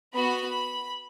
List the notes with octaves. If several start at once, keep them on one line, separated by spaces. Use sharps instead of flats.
B3 F#4 B5